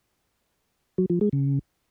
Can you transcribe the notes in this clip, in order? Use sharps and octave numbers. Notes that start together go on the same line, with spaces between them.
F#3
F3
G#3
C#3